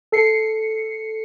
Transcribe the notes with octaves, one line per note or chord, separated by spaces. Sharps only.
A4 C7 C#7